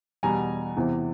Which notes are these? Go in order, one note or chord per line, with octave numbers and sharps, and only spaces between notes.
E2 B2 G3 G#5 A#5
E2 C3 E3